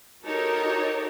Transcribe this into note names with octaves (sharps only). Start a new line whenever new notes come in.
D#4 F#4 G4 A4 A#4 C#5